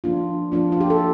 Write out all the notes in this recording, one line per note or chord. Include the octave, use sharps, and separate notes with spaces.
F3 A#3 D4 F4
F3 A#3 D4 F4
F4
G4
A4